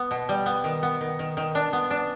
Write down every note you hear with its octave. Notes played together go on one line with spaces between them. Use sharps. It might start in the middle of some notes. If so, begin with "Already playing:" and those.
Already playing: B3
B2
G3
B3
D#3
B3
D#3
D#3
D#3
D4
B3
D4